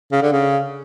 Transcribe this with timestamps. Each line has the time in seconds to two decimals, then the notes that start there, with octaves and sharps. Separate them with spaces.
0.12 C#3
0.22 D3
0.32 C#3